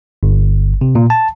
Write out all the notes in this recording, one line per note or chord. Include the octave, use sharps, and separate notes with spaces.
G1
C3
A#2
A5